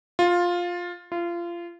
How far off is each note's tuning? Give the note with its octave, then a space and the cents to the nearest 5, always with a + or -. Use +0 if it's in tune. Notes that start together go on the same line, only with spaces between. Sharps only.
F4 +10
F4 -25